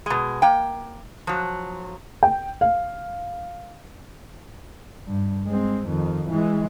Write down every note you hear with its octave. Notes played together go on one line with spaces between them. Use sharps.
B2 G#3
A#3 G5
F3 F#3
G5
F5
G2
G#3 C4
F2 D#3
E3 G#3